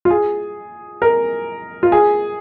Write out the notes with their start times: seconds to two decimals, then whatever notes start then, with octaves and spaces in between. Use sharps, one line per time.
0.05 F4
0.10 G#4
1.02 A#4
1.83 F4
1.92 G#4